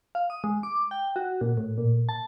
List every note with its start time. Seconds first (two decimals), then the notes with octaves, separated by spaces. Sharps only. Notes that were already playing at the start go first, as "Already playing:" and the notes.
0.15 F5
0.30 D#6
0.44 G#3
0.63 D6
0.91 G5
1.16 F#4
1.41 A#2
1.57 A2
1.78 A#2
2.09 A5